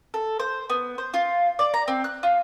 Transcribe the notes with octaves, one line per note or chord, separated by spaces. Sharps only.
A4
C5
B3
C5
F4
D5
A#5
C4
F#6
F4